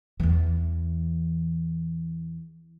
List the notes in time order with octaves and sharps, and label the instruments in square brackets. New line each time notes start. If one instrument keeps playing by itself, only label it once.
[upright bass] E2 E3